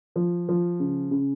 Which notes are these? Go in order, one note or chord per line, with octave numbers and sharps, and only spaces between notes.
F3
F3
C#3
C#3